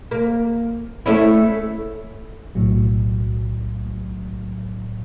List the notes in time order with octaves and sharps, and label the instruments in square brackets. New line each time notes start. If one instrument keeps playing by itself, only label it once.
[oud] A#3
A3 C#4 E4
[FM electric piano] B1 A2 F#3